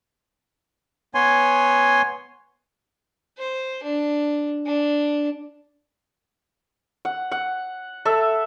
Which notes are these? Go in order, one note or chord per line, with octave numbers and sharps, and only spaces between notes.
B3 C#5 G#5 C6
C5
D4
D4
F#5
F#5
A4 E5